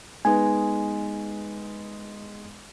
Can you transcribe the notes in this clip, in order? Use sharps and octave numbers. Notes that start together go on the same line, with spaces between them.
G#3 B3 D#4 G#5